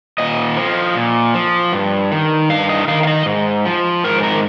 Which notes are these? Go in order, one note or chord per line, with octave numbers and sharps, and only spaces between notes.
A#2 D#5
F3
A#2
F3
G2
D#3
G2 F5
D#5
D#3 F5
F5
D#5
G#2
F3
G#2 A#4
C5
A#4